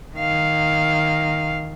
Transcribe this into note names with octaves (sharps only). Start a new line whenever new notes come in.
D#3 F5